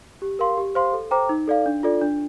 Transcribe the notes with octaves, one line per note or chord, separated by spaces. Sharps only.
G4
A#4 F5 C6
G4
C5 F5 C6
A4
C5 G5 A#5 D6
D#4
A4 D5 F5
D4
F4 A4 D5
D4